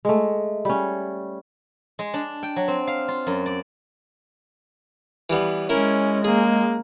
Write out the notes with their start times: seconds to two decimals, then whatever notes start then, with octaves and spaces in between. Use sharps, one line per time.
0.05 G#3 A3
0.65 G3 C#4
1.99 G#3
2.14 D4
2.43 G5
2.56 F#3
2.68 C4
2.87 F5
3.08 F4
3.27 F#2
3.46 D5
5.30 E3 G3 B3
5.69 G#3 C#4 E4 A#4
6.24 A#3 G#4